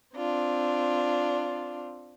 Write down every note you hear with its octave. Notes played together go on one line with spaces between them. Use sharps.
C4 D4 F4